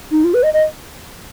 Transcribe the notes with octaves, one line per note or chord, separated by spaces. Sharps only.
D#4
F4
B4
D#5
D#5